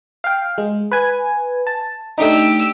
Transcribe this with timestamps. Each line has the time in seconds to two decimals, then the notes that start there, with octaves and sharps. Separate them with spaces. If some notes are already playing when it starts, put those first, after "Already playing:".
0.24 F5 G5
0.58 G#3
0.91 B4 G#5
1.67 A5
2.18 A3 D4 D#4 G4 E6